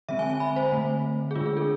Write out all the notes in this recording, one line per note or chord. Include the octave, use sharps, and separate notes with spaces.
D3 G#3 C4 E5
G#5
G#5
B5
C5
D3 A3 C4
G#4
D3 G#3 D4 F4
G#4
A4